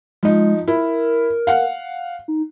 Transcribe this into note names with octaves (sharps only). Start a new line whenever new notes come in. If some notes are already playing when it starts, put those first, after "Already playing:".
F3 G#3 D#4
E4 A#4
F5 F#5
D#4